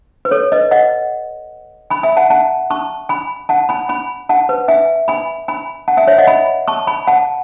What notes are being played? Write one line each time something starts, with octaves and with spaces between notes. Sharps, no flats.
B4
A4 C#5
B4 D#5
D#5 F#5
G#5 B5
E5 G#5
F#5 A5
F#5 A5
A5 C#6
G#5 B5
F#5 A5
G#5 B5
G#5 B5
F#5 A5
B4
E5 G#5
G#5 B5
G#5 B5
F#5 A5
E5 G#5
C#5 E5
D#5 F#5
G#5 B5
A5 C#6
G#5 B5
F#5 A5